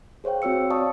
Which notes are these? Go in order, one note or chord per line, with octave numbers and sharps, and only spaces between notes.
G#4 C5 C#5 F5 G5
C4 F#4 C#5 E6 C#7
C#5 D5 F5 A5 C#6 D#6